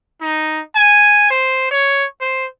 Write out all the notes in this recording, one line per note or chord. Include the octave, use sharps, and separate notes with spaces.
D#4
G#5
C5
C#5
C5